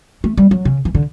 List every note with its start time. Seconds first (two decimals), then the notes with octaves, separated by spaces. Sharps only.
0.24 A3
0.37 G3
0.51 F#3
0.65 C#3
0.85 E3
0.95 D3